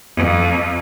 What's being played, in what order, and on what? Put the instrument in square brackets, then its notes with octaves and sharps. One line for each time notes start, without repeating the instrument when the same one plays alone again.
[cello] F2